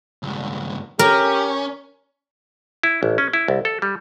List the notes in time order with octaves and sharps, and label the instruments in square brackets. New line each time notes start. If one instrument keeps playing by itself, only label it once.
[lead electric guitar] C#2 G2
[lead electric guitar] C#4 [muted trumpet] G4 [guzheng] A#4
[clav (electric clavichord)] E4
A1
C#4
E4
C2
A4
G3